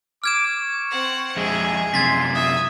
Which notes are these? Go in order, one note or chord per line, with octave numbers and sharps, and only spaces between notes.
D6 F6 G#6 E7
C#6
C4 F#5
F2 G#3 G#4 E5
F#2 C3 C6 G#6 A6 B6
E5 D#6